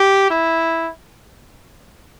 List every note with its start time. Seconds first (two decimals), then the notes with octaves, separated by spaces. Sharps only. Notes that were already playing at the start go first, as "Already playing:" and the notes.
Already playing: G4
0.31 E4